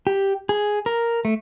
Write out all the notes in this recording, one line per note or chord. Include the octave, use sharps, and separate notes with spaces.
G4
G#4
A#4
A3